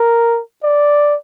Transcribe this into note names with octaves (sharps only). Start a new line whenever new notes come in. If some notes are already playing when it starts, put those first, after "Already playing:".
Already playing: A#4
D5